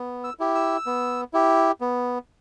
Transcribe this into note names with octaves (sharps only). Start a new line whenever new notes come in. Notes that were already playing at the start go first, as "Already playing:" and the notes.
Already playing: B3
E6
E4 G4
E6
B3
E4 G4
B3